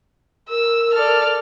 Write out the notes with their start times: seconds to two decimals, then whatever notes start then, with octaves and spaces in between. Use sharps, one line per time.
0.50 A#4 E6
0.94 A4 D5 F6